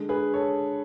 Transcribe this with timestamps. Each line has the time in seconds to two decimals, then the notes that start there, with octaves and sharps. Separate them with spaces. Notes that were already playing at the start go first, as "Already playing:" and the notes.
Already playing: D3 G#3
0.09 G#4 B4
0.34 A4 C#5